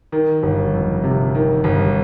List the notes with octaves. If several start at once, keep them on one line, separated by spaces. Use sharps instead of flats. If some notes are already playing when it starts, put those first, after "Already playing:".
D#3
G1
F2
C3
D#3
G1